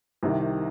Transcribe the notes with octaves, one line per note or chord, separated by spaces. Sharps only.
C2 C3 D#3